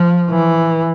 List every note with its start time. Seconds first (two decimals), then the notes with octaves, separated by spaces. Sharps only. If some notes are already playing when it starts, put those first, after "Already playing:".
Already playing: F3
0.30 E3